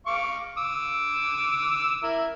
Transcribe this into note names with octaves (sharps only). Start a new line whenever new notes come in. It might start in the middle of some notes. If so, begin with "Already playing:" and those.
F5 C#6 D6
D6 E6
E4 A#4